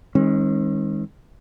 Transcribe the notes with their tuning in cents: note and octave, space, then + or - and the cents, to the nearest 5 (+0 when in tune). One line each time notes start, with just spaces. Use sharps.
D#3 +20 G#3 -25 C#4 -45